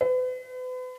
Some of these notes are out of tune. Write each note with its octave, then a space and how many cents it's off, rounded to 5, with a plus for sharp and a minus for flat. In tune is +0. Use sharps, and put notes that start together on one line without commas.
B4 +40